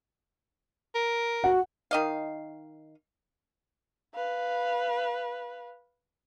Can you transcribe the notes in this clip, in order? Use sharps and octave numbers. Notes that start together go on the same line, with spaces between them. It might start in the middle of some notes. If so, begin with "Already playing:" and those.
A#4
F#4 F#5
D#3 D#5 F5
B4 F5